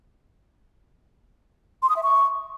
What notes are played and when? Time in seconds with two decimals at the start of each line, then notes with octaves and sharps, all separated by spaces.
1.82 C6
1.89 D#6
1.96 E5
2.03 C#6